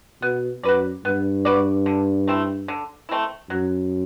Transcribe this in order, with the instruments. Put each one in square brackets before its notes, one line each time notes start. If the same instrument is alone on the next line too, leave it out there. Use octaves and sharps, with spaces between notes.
[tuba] B2 [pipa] B3
[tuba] F#2 [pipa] F#4 B4 D5
[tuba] G2 [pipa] B3
[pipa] F#4 B4 D5
D3
A3 C4 E4
D3
A3 C4 E4
[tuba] F#2 [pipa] F#3